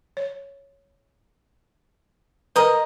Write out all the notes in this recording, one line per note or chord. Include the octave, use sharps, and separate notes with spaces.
C#5
A#4 B4 D#5 A#5